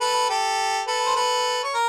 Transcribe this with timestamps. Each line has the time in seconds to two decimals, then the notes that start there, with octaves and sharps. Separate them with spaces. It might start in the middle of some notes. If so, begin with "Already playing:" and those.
0.01 A4 B4
0.29 G4 A4
0.87 A4 B4
1.06 C5
1.16 A4 B4
1.64 C#5
1.74 A#4